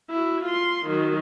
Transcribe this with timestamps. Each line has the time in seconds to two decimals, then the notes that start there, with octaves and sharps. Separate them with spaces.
0.10 E4 F#4
0.45 F4 C6
0.86 D#3 F#3